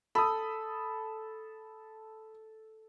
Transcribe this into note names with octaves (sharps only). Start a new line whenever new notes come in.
A4 B5 D#6